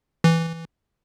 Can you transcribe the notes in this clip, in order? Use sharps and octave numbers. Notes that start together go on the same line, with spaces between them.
E3